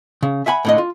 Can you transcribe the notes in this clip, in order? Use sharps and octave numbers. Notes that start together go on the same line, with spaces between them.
C#3
E5 F#5 G#5 B5
A2 D3 D#5
F4